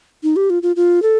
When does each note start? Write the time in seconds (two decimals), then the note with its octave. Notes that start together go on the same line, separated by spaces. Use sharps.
0.23 D#4
0.36 G4
0.50 F4
0.63 F4
0.76 F4
1.02 A4